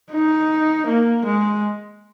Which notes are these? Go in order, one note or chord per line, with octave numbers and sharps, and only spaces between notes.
D#4
A#3
G#3